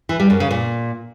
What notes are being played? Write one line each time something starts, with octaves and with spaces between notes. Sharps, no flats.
E3
G3
F#2
C#3
A#2